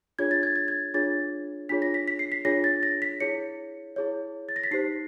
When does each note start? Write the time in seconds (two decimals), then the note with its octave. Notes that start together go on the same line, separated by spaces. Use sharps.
0.19 D4 F4 G#4 C#5 G#6
0.31 A6
0.43 G#6
0.56 A6
0.68 G#6
0.94 D4 F4 G#4 C#5 A6
1.69 D4 F4 G#4 C#5 B6
1.82 A#6
1.94 B6
2.08 B6
2.19 C7
2.32 B6
2.45 D4 F4 G#4 C#5 A#6
2.64 A6
2.83 A#6
3.02 B6
3.20 E4 G#4 C#5 C#7
3.96 E4 G#4 C#5
4.49 A6
4.56 A#6
4.64 B6
4.71 D#4 G4 C5 C7